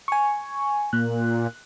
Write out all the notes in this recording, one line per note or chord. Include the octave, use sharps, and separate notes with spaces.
G#5 C#6
A#2 F#6